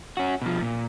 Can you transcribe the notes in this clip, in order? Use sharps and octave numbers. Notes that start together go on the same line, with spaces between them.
C#4 F#4
B2 F3
A#2